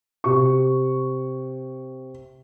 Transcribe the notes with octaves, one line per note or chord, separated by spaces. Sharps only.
C3 C#6